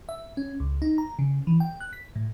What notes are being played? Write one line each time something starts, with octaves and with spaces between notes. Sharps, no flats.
E5
C#4
C#2
D#4
A#5
C#3
E3
G5
F#6
B6
A2